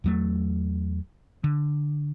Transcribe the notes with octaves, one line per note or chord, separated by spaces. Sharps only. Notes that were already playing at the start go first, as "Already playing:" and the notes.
E2 F#3 A3
D3